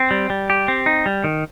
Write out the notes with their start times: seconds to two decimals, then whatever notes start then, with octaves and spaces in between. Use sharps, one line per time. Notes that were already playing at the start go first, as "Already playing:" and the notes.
Already playing: C4
0.11 G3
0.30 G3
0.50 G4
0.68 C4
0.86 D#4
1.06 G3
1.24 D#3